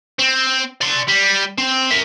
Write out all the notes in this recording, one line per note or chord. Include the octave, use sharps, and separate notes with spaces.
C4
D5 C6
G3
C4
A#4 E5